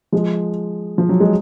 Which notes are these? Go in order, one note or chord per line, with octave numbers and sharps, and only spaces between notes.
F3 G#3
F3
F#3
G#3